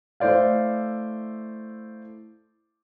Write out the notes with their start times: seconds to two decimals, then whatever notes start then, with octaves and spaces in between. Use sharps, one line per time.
0.20 A3 E4 C5 D5 F5